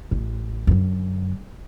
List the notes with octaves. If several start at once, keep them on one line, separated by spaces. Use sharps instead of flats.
A1
F#2 D3